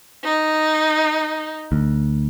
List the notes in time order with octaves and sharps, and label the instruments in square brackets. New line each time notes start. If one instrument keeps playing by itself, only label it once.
[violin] D#4
[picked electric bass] D2